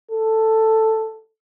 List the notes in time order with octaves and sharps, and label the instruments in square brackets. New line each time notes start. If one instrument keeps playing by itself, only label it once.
[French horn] A4